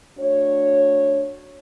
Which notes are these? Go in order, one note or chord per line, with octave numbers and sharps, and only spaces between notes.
A3 D4 F#4 C#5